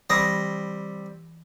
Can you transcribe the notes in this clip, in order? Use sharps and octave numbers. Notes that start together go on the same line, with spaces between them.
E3 G3 C4 B5 D#6 A#6